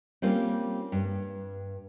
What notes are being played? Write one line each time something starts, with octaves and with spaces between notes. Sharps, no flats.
G3 A#3 C4 C#4 F4
G2